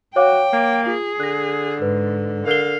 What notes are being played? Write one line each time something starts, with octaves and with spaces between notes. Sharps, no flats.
F#4 C#5 F5 G5 D6
A#3
F4 G#4
D3 F#6 A#6
G#2 B4
D3 A#4 F5 G7